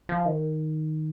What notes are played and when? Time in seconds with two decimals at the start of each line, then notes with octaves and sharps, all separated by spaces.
0.09 F3
0.26 D#3